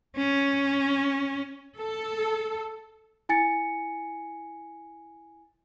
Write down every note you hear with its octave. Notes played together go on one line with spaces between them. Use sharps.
C#4
A4
E4 G#5 A6 C#7